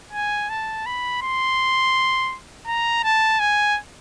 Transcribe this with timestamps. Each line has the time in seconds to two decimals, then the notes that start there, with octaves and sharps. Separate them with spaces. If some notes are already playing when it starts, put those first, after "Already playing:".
0.13 G#5
0.50 A5
0.86 B5
1.22 C6
2.67 A#5
3.04 A5
3.40 G#5